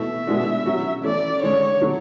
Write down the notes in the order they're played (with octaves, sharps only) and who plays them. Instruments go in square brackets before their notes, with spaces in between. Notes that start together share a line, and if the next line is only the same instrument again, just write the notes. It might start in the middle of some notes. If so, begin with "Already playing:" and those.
Already playing: [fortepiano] B2 A3 E4 [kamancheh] E5
[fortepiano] B2 G#3 D4 F#4
F#3 C#4 F#4
[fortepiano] E3 A3 C#4 E4 [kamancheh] D5
[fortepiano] D3 G#3 D4 [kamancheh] C#5
[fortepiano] D3 F#3 A3